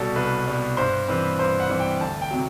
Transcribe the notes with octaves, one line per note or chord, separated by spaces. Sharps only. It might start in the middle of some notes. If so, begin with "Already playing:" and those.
Already playing: C2 B2 G3 F#4 A4
C2 B4
B2 G3
G2 C5
E3 G3 C4 B4
G2 C5
F#5
E3 G3 C4
G5
D2 A5
G5
C3 F#3